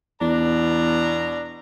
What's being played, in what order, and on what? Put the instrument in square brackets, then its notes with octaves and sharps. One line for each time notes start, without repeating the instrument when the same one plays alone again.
[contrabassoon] E2 [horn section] B2 D4 A#5